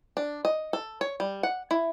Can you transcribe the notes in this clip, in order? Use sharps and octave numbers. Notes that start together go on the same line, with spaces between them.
D4
D#5
A4
C#5
G3
F#5
E4